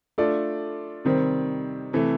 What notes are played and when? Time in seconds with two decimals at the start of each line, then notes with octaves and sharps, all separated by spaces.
0.18 A3 D4 F4 A4 D5
1.05 C3 D#3 G3 C4
1.93 C3 E3 A3